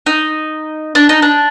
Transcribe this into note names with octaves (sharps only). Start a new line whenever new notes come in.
D#4
D4
D#4
D4